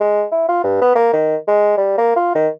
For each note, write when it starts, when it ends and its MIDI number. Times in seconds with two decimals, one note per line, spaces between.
0.01 0.24 56
0.32 0.46 64
0.49 0.61 65
0.64 0.79 43
0.81 0.94 59
0.95 1.09 58
1.13 1.36 51
1.47 1.77 56
1.77 1.95 55
1.98 2.14 58
2.16 2.30 65
2.35 2.48 51